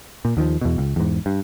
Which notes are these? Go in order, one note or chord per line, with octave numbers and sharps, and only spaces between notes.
A#2
D#2 D#3 F3
E2 B2
C#2
E2 G#2
G2